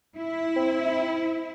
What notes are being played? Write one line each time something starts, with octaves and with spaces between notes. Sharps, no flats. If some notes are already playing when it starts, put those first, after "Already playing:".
E4
C4